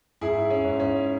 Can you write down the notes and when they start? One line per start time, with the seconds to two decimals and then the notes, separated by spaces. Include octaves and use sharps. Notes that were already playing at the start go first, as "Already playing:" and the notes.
0.21 G#2 E4 G#4
0.50 C#4
0.64 G#2
0.80 C#4